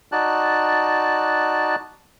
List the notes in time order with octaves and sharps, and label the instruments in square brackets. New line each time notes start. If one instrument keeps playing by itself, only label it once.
[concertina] D#4 F#4 D5 A5 F#6